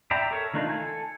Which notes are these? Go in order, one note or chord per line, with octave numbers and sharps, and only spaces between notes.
D5 E5 G5 A#5 B5
A4 A#4 C#5
D#3 A3 D4 D#4 F4
A4 G#5